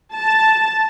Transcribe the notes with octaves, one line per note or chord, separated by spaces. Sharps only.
A5